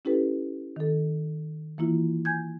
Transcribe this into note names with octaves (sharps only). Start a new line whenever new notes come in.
C#4 E4 G4 A4 B4
D#3 A4
E3 A#3 E4 F4
G#5 G6 G#6